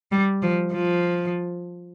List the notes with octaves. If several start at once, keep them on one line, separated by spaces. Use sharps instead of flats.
G3
F3
F3